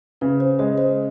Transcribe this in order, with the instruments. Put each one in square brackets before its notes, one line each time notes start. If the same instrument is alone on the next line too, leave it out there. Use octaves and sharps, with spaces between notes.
[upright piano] C#3 [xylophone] B4
[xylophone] C5
[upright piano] G#3 [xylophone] C#5
[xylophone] C5